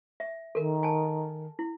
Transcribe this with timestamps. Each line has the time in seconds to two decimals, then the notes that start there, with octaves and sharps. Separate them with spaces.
0.20 E5
0.55 D#3 A4 A#4
0.83 G#5 A5
1.59 E4